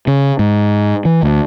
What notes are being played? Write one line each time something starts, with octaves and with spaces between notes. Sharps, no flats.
C#3
G#2
E3
D2